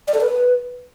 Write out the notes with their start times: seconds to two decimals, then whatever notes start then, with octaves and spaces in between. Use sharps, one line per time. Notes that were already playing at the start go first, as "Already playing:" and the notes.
0.08 D5
0.14 A4
0.21 B4